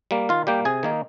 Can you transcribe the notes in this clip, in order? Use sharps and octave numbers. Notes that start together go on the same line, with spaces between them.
G3 A#3
D#3 F4 F5
G3 A#3 G4 G5
C3 G#4 G#5
D#3 A#3 D#4